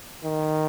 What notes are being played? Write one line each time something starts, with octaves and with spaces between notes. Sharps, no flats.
D#3